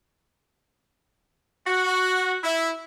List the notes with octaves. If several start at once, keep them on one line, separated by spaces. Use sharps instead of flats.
F#4
E4